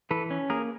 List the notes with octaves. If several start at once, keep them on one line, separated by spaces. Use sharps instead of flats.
E3 A4 B4
C#4
A#3 G#4 A#4